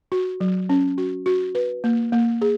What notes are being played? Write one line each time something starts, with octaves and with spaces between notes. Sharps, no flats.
F#4
F#3
C#4
F#4
F#4
B4
A#3
A#3
G#4